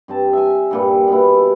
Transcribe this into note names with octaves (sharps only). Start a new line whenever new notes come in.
G2 C4 A5
E5 G#5
G2 A#2 G3
B2 B3 E4